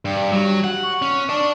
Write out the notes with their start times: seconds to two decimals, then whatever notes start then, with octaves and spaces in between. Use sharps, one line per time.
0.05 G2
0.32 F#3 G3
0.64 F#5
0.83 C#6
1.02 C#4
1.29 D5 A5